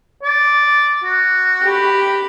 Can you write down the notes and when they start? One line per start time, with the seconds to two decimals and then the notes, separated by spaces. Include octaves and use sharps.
0.23 D5
1.04 F#4
1.65 G4 B5